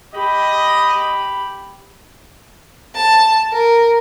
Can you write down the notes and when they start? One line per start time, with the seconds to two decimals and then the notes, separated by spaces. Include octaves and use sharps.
0.14 G4 D#5 B5
2.95 A5
3.52 A#4